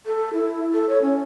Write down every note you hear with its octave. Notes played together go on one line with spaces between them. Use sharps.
A4
E4
A4
C#5
C#4